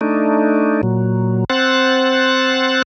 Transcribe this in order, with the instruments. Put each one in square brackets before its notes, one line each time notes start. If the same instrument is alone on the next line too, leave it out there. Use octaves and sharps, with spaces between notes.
[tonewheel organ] A3 D4 D#4
A#2 F#3
C4 C5 F#5 F#6 A6